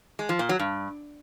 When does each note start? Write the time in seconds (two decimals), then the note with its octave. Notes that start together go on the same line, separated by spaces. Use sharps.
0.19 G#3
0.29 F3
0.39 A#2
0.49 F#3
0.60 G2